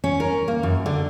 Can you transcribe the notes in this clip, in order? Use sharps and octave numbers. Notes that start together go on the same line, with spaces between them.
C#4
A#4
A#3
F#2
D3